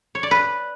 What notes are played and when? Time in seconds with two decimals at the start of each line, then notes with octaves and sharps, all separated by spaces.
0.15 C#5
0.23 D5
0.31 B4